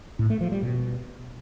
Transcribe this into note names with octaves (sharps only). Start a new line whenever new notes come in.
A2
A3
F3
G3
B2